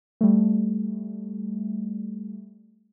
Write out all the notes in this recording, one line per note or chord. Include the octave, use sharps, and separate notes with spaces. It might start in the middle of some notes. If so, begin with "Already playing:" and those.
G3 A3